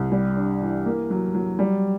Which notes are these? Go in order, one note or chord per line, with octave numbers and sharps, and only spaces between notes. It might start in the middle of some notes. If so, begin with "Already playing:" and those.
Already playing: C2
G3
D4
E3
A#3
F#3
F#3
G3